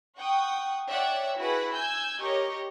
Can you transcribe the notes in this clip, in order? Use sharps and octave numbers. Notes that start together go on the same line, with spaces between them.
F#5 G5 C#6 D#6
C#5 D5 E5 F#5 G5
E4 F#4 G#4 B4 F#5 B5
G#5 E6 G6 G#6
G4 A#4 C#5 D#5 C#6